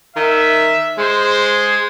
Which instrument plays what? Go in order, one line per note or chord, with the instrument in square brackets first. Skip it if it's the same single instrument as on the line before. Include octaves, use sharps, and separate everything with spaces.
[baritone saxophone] D#3 [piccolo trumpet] E5
[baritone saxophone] G#3 [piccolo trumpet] C5